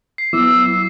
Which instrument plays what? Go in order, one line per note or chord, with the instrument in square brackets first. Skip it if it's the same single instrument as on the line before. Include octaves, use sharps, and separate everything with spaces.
[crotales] C7
[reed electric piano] F#3 B3 E4 [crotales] D6 [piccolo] E6